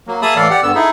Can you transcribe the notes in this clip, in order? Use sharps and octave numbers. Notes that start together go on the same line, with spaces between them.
F#3 A#3
A#3 G#4 E5 A5 B5 D#6
A2 E3 A4 D5 F5
G4 D5 F#5
G2 D3 B3 E6
D#4 E4 G#4 A4 E5